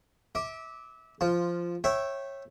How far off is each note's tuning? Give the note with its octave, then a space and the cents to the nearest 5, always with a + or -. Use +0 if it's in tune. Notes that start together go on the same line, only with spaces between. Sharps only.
E5 -30 D6 +0
F3 -10 F4 +0
C#5 -20 E5 +0 G5 -20